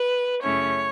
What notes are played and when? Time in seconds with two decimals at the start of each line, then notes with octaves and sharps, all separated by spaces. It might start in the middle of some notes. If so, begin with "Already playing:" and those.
Already playing: B4
0.42 F#2 C#3 A3 C#4 E4 C#5